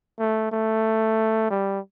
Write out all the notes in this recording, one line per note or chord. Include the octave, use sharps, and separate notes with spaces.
A3
A3
G3